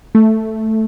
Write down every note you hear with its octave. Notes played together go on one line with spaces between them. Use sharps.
A3